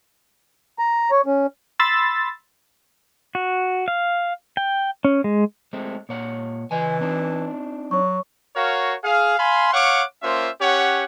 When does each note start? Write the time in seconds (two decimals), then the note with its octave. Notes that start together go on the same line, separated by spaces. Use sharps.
0.79 A#5
1.11 C#5
1.26 C#4
1.79 B5 C6 E6 A6
3.35 F#4
3.88 F5
4.57 G5
5.05 C#4
5.24 G#3
5.73 G#3 A3 C4
6.09 A#2 C#5 F#5
6.71 C#3 E3 D#5 G#5
7.01 C4 D4 D#4
7.91 F#3 C#5 C#6
8.56 F#4 A#4 C#5 F5
9.04 G#4 F5
9.39 F5 G#5 B5 C6
9.74 C#5 F5 F#5 C#6 D6
10.22 A#3 C#4 F4 C5 E5
10.61 C#4 G4 C#5 F#5